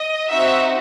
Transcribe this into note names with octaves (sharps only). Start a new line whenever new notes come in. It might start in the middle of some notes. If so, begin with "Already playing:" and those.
Already playing: D#5
C4 D#4 F#4 E5